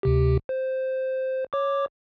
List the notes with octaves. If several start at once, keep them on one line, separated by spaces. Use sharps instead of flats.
D2 C3 G4
C5
C#5 D6